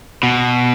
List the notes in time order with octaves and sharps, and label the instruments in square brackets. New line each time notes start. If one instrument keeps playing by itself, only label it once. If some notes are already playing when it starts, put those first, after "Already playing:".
[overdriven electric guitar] B2